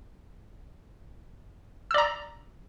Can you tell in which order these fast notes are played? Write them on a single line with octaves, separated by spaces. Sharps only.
E6 D5 A#5